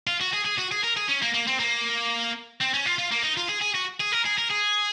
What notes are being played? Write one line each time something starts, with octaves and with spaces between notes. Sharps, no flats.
F4
F#4
G#4
G#4
F#4
G#4
A#4
G#4
C#4
A#3
A#3
C4
A#3
C4
C#4
F4
F4
A#3
D#4
F4
G#4
G#4
F#4
G#4
A#4
G#4
A#4
G#4